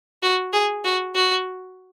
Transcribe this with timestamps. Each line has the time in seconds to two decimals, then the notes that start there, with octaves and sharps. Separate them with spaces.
0.22 F#4
0.53 G#4
0.84 F#4
1.15 F#4